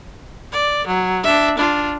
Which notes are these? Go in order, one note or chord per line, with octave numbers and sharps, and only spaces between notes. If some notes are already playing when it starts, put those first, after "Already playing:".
D5
F#3
D4 E5
D4 F4